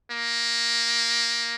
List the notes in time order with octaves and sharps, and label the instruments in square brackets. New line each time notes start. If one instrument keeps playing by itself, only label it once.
[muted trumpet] A#3